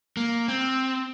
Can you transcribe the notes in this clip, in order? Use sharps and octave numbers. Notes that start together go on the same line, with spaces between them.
A#3
C4